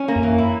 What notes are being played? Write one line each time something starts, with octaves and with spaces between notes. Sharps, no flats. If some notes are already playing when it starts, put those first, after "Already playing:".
Already playing: C#4
A#3
F#2
E3
E4